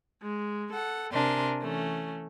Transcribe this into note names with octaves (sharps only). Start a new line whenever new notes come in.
G#3
A4 F#5
C3 D4 A#4 G#5 C6
E3 A3 C#4